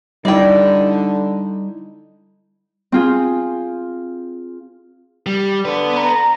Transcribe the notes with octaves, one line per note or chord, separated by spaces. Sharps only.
D3 G3 D#4 E4 D5 G5
C4 F4 G#4
G3
D3 B3 B4
A#5